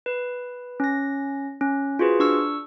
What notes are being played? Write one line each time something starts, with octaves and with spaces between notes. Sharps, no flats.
B4
C#4 A#6
C#4
F4 F#4 G#4 B4 C5
D4 C#6 E6 F6